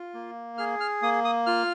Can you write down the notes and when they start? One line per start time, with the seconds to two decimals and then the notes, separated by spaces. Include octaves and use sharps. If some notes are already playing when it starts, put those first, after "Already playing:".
Already playing: F4
0.14 A#3
0.58 G#4 F6
0.80 F6
1.02 A#3 D#6
1.25 D#6
1.46 F4 F6